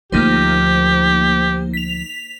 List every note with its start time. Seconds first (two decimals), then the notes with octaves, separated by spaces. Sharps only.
0.12 D2 F3 A#3 D#4 G4 C5
1.74 B6 F7